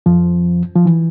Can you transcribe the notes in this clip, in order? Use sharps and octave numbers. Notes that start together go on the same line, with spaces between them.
F2 F3
F3
E3